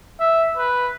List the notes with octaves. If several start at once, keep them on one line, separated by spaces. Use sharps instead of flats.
E5
B4